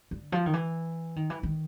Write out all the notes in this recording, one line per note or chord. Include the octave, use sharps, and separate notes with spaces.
D3
F3
D#3
E3
D#3
E3
D#3